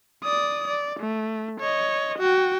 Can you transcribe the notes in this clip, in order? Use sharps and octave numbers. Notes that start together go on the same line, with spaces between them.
D5 D#6
D5
A3
C#5 D#5
F#4 G5